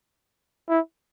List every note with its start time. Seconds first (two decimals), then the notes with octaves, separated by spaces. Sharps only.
0.69 E4